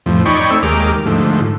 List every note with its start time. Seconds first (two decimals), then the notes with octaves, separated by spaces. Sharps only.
0.06 F2 A2 F3
0.26 D#4 C#5 D5 G5 B5 C#6
0.50 A3 C4 C#5 E5
0.63 D#2 G#3 G4 A#4 D6 F6
1.06 G#2 D3 F3 A3